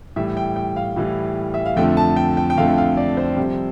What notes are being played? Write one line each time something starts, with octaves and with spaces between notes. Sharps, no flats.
A2 E3 G3 E5
G5
G5
F5
A2 E3 G3
E5
F5
F2 D3 F3 A3 G5
A5
G5
G5
G5
F2 D3 F3 A3 F5
F5
D5
C5
F2 C3 G3